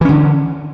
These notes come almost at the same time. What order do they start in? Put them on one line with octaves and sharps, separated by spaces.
E3 C#4 D3